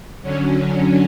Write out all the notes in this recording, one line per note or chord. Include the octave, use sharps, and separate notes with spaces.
D3 F#3 C#4